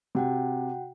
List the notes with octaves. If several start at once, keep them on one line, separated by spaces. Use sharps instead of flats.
C3 F#4 F#5 G5